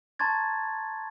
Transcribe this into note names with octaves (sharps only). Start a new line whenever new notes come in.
A5 A#5 C6 C#6 G#6 A6